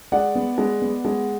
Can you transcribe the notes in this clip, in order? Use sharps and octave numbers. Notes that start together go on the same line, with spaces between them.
G#3 D5 F#5
B3
G#3
B3
G#3